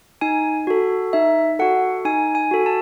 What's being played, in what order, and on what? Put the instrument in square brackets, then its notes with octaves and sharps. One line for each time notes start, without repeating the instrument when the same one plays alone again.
[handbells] D#4 G#5
F#4 A4
D#4 E5
F#4 A4 F#5
D#4 G#5
G#5
F#4 A4
A5